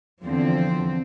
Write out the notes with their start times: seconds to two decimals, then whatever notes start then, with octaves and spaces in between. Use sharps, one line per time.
0.24 E2 D3 F3 C4